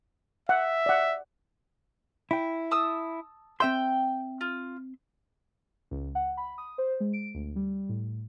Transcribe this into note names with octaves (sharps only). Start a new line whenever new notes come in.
E5 F#5
D5 F#5
E4 G5
A5 D#6 E6
C4 E5 G5 C6
F4
C#2
F#5
B5
D#6
C5
G#3
D7
D2
G3
A2